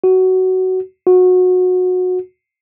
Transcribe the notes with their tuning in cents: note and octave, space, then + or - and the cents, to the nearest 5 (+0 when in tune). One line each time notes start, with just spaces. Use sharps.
F#4 +15
F#4 -20